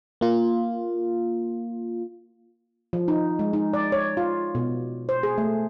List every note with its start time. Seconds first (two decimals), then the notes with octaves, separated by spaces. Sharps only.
0.21 A#3 F4
2.93 F3
3.08 D#4
3.39 G#3
3.53 D#4
3.73 D5
3.92 C#5
4.17 F4
4.55 B2
5.09 C5
5.23 G#4
5.38 A3